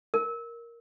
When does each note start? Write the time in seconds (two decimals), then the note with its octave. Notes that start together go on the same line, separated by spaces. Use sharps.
0.14 A#4